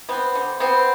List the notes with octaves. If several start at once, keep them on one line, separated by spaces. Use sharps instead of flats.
B3 C4
D3
B3 C4